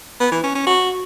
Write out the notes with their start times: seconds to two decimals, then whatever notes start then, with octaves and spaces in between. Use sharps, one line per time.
0.20 B3
0.32 E3
0.44 C#4
0.55 C#4
0.67 F#4